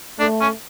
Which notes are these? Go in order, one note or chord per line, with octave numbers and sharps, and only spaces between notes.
A3 D4
C#4